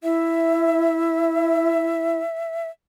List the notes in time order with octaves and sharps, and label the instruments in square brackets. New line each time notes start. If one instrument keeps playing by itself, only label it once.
[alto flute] E4 [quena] E5